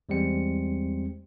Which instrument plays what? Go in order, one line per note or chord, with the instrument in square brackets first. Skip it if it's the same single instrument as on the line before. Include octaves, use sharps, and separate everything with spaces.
[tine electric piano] E2 G3 G#3 C4 C#7